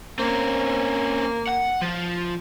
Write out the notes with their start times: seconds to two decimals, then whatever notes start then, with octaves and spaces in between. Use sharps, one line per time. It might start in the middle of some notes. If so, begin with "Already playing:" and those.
0.19 A#3 C4 C#4
1.49 F#5
1.82 F3 F4